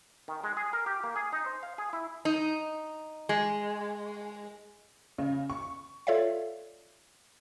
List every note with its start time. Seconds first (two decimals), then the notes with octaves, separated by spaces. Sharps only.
0.28 D#3
0.44 G#3
0.57 G#4
0.73 A#4
0.86 G4
1.04 A#3
1.16 G#4
1.33 D#4
1.46 C5
1.63 F5
1.78 G#4
1.93 E4
2.25 D#4
3.29 G#3
5.18 C#3
5.50 C#6
6.07 F4 A4 C#5 D5 E5 F5